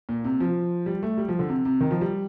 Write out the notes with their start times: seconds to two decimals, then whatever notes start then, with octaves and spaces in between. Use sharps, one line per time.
0.09 A#2
0.24 C3
0.40 F3
0.86 G3
1.03 A3
1.18 G3
1.28 F3
1.39 D3
1.49 C3
1.65 C3
1.81 D#3
1.91 F3
2.01 G3